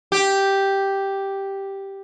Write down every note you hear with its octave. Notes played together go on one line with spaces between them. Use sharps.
G4